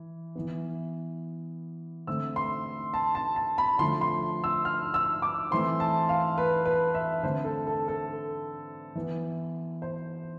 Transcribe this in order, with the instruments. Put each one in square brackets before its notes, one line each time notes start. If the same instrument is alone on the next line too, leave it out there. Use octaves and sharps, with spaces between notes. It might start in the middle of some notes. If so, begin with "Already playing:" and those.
Already playing: [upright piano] E3
E3 B3
D3 A3 C4 E6
C6
A5
A5
A5
B5
D3 F3 A3 C6
C6
E6
F6
E6
D6
E3 A3 C4 C6
A5
F5
B4
B4
E5
D3 A3 C4 C5
A4
A4
A4
E3 B3
C5